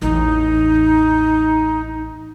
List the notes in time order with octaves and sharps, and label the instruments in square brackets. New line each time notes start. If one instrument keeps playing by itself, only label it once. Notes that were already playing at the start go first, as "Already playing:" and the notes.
[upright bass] A1 E2 [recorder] D#4